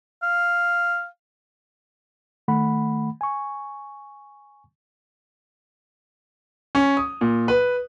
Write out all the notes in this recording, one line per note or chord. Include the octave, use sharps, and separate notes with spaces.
F5
D#3 A3 F#5 B5
G#5 C#6
C#4
D#6
A#2
B4